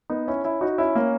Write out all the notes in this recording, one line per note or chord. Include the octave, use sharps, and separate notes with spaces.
B3 D#4
C#4 E4
C#4 E4
D#4 F#4
C#4 E4
A#3 C#4